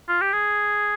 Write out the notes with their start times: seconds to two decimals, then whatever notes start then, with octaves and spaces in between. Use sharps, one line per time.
0.08 F4
0.21 G4
0.33 G#4